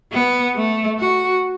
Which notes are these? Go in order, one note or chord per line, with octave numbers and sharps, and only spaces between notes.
B3
A3
F#4